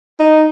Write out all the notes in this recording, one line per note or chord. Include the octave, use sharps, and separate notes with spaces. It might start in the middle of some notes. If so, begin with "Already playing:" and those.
D#4